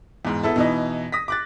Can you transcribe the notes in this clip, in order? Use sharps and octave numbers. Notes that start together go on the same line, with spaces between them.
E2 G#2
B3 E4 A4 A5
B2 E3 D#4
D#6 A#6 B6
D6 F#6 A6